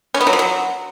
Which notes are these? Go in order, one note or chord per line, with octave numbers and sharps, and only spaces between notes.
C#4
B3
F#3
F3
F#3